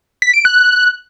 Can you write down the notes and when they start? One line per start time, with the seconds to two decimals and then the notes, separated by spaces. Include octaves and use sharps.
0.22 B6
0.34 D7
0.45 F#6